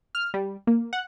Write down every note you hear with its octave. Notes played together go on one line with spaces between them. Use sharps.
F6
G3
A#3
F#5